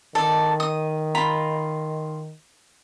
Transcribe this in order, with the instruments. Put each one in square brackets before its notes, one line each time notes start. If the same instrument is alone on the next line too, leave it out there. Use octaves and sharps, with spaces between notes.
[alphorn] D#3 [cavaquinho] A4 D5
[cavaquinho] D#6
F4 A#5 B5